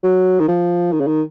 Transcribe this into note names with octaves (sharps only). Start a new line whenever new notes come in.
F#3
D#3
F3
D#3
C#3
D#3